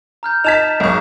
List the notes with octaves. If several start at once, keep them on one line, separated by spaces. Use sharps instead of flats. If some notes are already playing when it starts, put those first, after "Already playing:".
A#5 F6 G6
D#4 A5 G#6 B6 E7 F7
B1 G#2 C#6